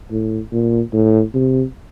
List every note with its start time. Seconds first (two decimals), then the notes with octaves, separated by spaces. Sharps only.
0.11 A2
0.52 A#2
0.93 A2
1.34 C3